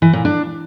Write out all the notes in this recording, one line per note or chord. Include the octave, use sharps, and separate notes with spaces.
E3
A#2
D4